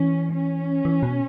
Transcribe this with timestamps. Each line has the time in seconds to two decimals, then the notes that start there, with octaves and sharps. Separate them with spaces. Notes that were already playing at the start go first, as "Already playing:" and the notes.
Already playing: E3 C#4
0.33 C#4
0.85 E3
1.03 B2